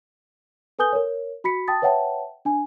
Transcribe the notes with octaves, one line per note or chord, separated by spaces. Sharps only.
A4 B4 G#5 D#6 G6 G7
A#4 C#5
F#4 B5 B6 C#7
G5 A5 D#6 A6
B4 C#5 E5 F#5 G5 A5
D4 G#5